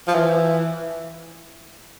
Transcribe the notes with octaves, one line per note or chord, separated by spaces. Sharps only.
F3
E3